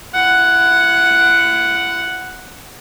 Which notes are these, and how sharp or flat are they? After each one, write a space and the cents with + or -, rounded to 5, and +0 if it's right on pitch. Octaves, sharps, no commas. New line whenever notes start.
E4 +35 F#5 +0